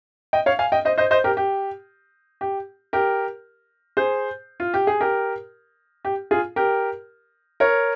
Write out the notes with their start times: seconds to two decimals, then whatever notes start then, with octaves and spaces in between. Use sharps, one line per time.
0.33 D#5 G5
0.46 C#5 F5
0.59 F5 G#5
0.72 D#5 G5
0.85 C5 D#5
0.98 C5 D#5
1.11 C5 D#5
1.24 G4 A#4
1.37 G4
2.41 G4
2.93 G4 A#4
3.97 G#4 C5
4.60 F4
4.74 G4
4.87 G#4
5.01 G4 A#4
6.05 G4
6.31 F4 G#4
6.56 G4 A#4
7.60 A#4 C#5